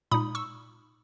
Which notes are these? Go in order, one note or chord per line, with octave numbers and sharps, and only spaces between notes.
A#2 G#3 D#4 B5 D#6
C#6 E6